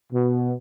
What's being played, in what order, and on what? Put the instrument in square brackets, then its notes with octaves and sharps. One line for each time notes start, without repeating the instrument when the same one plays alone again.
[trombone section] B2